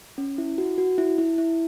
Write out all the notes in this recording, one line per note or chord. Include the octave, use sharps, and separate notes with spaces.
C#4
E4
F#4
F#4
E4
E4
E4